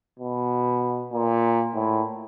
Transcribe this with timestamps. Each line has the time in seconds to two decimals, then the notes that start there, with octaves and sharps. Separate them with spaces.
0.20 B2
1.13 A#2
1.75 A2